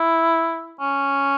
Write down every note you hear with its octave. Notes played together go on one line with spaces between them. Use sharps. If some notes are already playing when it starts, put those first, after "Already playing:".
Already playing: E4
C#4